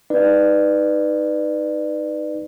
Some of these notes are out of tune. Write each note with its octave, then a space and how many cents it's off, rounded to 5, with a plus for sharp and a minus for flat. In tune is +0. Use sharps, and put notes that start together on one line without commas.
D#4 +0 B4 +0 D5 +25